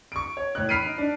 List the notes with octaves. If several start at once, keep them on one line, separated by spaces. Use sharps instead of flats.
C#6 D7
C#5
A2 C#5 F#6
B5 F6 B6 C7 D7 D#7
D#4
D4